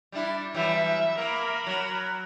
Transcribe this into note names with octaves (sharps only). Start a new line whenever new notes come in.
G3 D4 E4
E3 F#3 G3 E5
A#3 A#4 B5
F#3